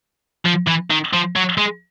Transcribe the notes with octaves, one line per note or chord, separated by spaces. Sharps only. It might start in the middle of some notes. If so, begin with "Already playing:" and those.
F3
E3
D#3
F3
F#3
G#3